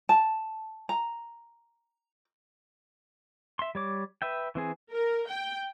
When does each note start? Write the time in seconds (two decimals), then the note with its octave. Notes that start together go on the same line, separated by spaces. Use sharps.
0.09 A5
0.89 A#5
3.59 E5 C6
3.75 G3 C#5 D6
4.22 B4 E5 G5
4.55 E3 C4 G#4
4.91 A#4
5.28 G5